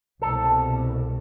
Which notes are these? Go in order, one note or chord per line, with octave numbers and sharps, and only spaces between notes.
C2 B2 A4